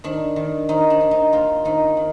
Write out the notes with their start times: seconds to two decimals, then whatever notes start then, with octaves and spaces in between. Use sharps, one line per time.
0.04 D#3 D4
0.36 D#3
0.69 D#3 D#4
0.90 D4
1.01 D4
1.11 D#4
1.33 A#3 F4
1.65 D#3 D#4
1.97 D#3